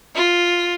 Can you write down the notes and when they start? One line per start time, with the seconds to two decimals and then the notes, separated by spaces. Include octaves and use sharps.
0.15 F4